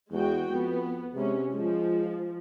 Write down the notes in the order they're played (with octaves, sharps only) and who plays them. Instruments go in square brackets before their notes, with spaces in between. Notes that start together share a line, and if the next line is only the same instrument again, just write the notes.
[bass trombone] E2 [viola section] G#3 F#4 G5
[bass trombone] F2 [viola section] B3
[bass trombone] C3 [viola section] G#3 C#4
[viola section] F3 [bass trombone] G#3